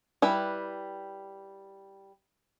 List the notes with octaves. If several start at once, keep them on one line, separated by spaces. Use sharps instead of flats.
G3 E4 B4